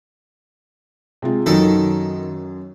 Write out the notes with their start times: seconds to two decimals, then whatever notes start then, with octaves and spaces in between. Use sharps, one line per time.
1.22 C3 G#3 F4
1.46 F#2 D#3 F#3 A4